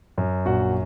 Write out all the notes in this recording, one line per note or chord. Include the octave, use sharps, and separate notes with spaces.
F#2
A#1 F#4 F#5